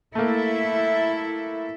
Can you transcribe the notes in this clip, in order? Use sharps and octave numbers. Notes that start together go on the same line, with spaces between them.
A3 A#3 E4 A4 E5